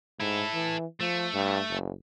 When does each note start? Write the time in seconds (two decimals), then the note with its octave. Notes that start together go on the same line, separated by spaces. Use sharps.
0.20 G#2 E4 A4
0.54 E3
1.01 F3 A3
1.34 G2
1.70 F#1